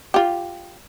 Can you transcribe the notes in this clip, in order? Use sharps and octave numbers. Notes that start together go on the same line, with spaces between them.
F4 G4